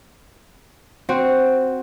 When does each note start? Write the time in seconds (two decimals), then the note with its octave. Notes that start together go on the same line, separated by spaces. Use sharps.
1.09 C4 F#4